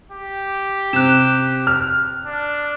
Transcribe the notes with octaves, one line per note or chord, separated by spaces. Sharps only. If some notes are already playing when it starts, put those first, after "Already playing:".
G4
C3 F#6 E7
F6
D4